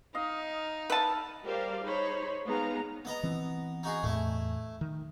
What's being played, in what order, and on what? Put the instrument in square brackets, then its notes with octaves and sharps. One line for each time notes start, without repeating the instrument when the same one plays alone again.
[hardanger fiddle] D#4 [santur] D#5 F5
[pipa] B4 A5 [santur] E5 F5
[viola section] G3 G4 A#4 C5 D5 F5
D#4 G#4 C5 C#5 B5
G#3 B3 D#4 F5 A#5
[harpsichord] B3 D#5 A#5
[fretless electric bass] E3 C4
[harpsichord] D#4 F#4 G#4
[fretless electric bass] E2 A2 [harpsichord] A3 E4
[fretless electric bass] D#3